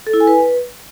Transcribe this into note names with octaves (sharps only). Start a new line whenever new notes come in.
A4
E4
G#5
B4